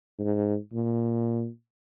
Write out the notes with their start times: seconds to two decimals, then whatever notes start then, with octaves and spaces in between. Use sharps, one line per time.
0.19 G#2
0.73 A#2